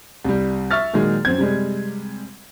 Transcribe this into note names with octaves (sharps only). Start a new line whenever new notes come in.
C2 G3
E5 C#6 F6 A6
A#2 D#3 F#3 G#3
F#2 C4 G#6
C3 G3 G#3